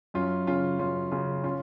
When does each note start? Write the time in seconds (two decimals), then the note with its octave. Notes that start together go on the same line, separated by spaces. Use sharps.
0.14 F#2 C#4 F4
0.47 C#3 C#4 F4
0.79 F#2 C#4 F4
1.11 C#3 C#4 F4
1.44 C#4 F4